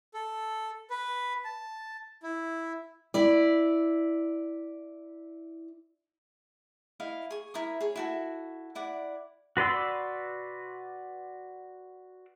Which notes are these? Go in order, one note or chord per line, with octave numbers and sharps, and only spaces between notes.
A4
B4
A5
E4
E4 D5
E4 D#5 F5
G#4 C#6
E4 A#4 D#6
G#4 C#5
E4 F#4 A4
E4 D5 F#5
F#4 B4 D5 C6 E6